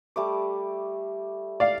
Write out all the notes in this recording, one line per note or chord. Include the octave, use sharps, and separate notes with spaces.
G3 A3 D6
D5 F5